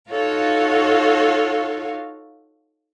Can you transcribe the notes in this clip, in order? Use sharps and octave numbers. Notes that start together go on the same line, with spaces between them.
D#4 F4 F#4 A4 C#5 F5